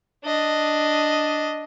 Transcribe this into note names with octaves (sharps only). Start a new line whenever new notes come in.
D4 D#5